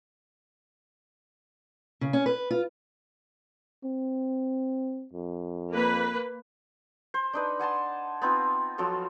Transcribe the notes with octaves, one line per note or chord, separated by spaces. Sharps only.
C#3
C#4
B4
F4
C4
F2
A#3 B4
C5
D4 D#4 B4
F#5 G#5 A5 C6
B3 C4 D#4 F4
F3 F#3 F4 A4